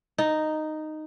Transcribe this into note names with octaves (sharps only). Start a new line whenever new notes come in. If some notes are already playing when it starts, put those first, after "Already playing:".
D#4